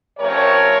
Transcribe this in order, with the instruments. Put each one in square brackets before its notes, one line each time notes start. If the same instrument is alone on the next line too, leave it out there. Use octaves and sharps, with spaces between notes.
[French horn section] C3 F3 A3 C#4 A#4 C#5